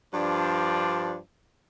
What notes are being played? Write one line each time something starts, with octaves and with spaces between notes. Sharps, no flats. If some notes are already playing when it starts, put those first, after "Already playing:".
G2 F3 D4